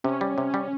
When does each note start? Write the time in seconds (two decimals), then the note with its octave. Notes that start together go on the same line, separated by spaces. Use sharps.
0.04 C3 C#4
0.21 G3
0.38 C3
0.54 G3